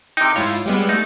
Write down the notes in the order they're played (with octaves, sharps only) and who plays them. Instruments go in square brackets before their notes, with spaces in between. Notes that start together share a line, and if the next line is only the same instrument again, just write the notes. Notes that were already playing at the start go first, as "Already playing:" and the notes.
[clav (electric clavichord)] C3 D#4 [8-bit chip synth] G5
[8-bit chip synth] G#2 E4 F4 [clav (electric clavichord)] C#5
[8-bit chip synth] G3 G#3 B3
[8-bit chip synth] A3 [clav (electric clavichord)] D#4